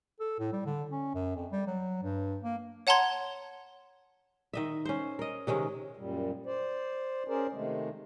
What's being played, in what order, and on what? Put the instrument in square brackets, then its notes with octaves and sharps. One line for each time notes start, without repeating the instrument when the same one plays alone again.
[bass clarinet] A4
A2
G3
D3
C#4
F#2
F2
G3
F#3
G2
A#3
[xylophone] C#5 F#5 A5 A#5 C6 G#6
[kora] D#3 D#5 E5
C#4 C5
A#4 D#5
C3 D#3 G#3 C#4
[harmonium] F#2 A#2 G3
C5 D5
C#4 G#4 A#4 C5 D5
C3 D#3 G#3 A3